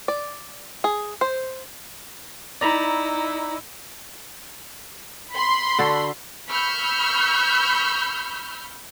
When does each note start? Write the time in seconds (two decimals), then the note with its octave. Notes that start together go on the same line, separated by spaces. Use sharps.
0.08 D5
0.84 G#4
1.21 C5
2.61 D#4 E4 D5 A#5 B5
5.33 B5 C6
5.79 D3 F#4 A4
6.48 B5 C#6 E6 F6 G6